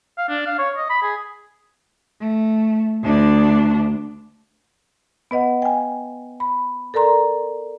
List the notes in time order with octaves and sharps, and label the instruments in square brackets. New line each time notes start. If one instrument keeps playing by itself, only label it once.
[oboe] F5
D4
F5
C#5
D#5
B5
G#4
[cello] A3
D2 D4
[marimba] B3 B4 D#5 F#5
G5 G#5
B5
A4 A#4 D5 A#5 C6